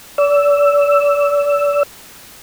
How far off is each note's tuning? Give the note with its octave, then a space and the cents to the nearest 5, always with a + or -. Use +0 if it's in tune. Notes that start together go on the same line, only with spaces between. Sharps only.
D5 -35 E6 +5